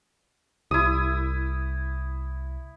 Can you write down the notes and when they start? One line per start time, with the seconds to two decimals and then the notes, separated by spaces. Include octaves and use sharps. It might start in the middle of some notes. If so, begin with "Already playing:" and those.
0.71 C2 E4 D#6